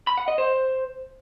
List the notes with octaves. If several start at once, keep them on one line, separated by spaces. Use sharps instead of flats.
B5
F#5
D#5
C5